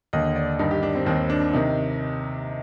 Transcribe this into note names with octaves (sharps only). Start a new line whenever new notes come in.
D#2 D3 D#5
D5
G2 D#3 D#4
G4
D4
C4
D#2 D#3 C4
D4
C3 D#3 D#4